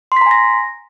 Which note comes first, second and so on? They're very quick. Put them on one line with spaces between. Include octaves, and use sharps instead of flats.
C6 B6 A#5 G#5 A#6